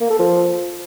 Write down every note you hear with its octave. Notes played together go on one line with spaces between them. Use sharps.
A#3
A4
F3